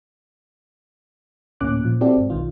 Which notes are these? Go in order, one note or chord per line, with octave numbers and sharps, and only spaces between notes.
D2 A2 A#3 C#4 D6 F#6
A#2 F3
C4 E4 F#4 G4 A4 D5
G1 G#2
B1 D#3 F4